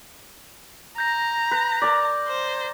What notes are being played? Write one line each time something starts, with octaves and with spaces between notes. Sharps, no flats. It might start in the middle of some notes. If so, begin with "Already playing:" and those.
A#5 G6 A#6
B4
A#4 D5
C5